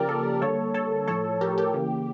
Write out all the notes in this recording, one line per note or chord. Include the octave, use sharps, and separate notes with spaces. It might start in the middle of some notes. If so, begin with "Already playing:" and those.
Already playing: C#3 F3 A#3 G4 A#4 D5
A4
D3 G3 A#3 A4 C#5
A4 C#5
A2 F3 A3 A4 C#5
G4 A#4
G4
C#3 E3 A#3